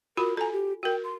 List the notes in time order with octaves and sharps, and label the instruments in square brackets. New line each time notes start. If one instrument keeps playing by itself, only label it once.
[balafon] F4 F#4 B5 [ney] A#4
[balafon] A4 G#5 [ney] A#5
[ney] G4
[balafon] F#4 A#4 [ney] G5
[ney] C6